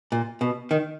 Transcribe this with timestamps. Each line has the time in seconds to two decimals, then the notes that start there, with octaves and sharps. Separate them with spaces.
0.12 A#2
0.41 B2
0.71 D#3